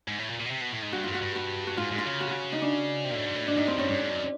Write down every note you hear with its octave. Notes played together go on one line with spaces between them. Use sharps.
G#2
A2
A#2
A#2
B2
C3
B2
A2
G#2
G2 F#4
G2 F4
F#4
G2
F#4
F#4
G#2 F4
G#2
F4
C#3
F#4
F#4
D#4
D4
C3
A#2
A2
G#2
A2
G#2 D4
G#2 D#4
G2 C4
G2 C#4
G2 D4
G#2
F#2